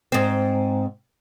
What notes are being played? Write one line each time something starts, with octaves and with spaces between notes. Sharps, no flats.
G#2 C4